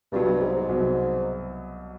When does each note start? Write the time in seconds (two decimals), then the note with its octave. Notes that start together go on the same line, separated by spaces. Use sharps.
0.12 C2 G2 B2 F#3
0.26 G2
0.40 G#2
0.54 G#2
0.69 C2 B2 F#3